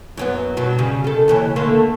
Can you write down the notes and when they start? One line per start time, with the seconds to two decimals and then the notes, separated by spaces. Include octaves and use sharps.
0.17 F#2 F#3 B3
0.57 G2 B2 F#3
0.78 C#3 G3
1.04 D#3 A4
1.28 D#2 C#3 E3
1.56 D3 A3 A#3